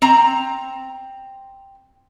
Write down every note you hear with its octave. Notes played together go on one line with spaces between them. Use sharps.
C4 A#5